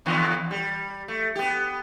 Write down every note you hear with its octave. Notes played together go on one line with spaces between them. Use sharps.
D#2 D3 B3
G3
A3
B3 G4